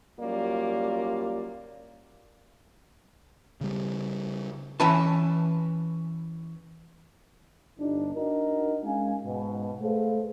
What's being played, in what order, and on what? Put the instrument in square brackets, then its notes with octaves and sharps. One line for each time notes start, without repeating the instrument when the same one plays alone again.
[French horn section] F#2 G3 A#3 F4 D5
[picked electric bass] C#3 G3
[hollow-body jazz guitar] E3 C#4 B4 A5
[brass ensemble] G1 D4 D#4
D4 D#4 F#4 A#4 D#5
G#3 C#4 F5 G#5
G#2 B2
A3 G#4 A4 B4 C5 F5